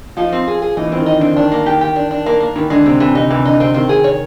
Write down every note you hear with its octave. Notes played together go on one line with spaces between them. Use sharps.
F3 D#4
C4
G#4
G#4
E3 D#4
E3 C4
D#3
D#4
D3
C4
D#3 D4
A#3
D#3 G4
G4
D4
D4
A#3
A#3
D#3 E3
D3 G#3
C3 C4
C3 E3
C3 D#4
C3 E3
D3 D#4
C3 C4
D#3 C4
G#4
C#5